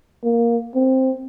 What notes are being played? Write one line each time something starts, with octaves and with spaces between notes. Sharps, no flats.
A#3
C4